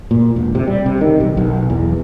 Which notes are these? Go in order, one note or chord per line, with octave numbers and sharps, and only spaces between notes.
A#2
E1
C3
G3
C3
D#3
B1
B1
E2